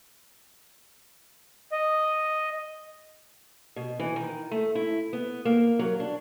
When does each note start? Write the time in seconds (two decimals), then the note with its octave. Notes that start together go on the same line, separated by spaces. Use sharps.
1.72 D#5
3.76 B2
3.99 E3
4.16 D#3
4.51 A3
4.75 E4
5.13 B3
5.45 A#3
5.79 F#3
6.00 D4